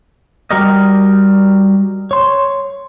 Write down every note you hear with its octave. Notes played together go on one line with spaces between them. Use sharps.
G3 F#4 G4 A#4 D5 D#5
C#5 C6